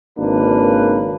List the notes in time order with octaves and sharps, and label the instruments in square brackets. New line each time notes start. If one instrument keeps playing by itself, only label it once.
[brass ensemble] G#1 C#3 A#3 D4 B4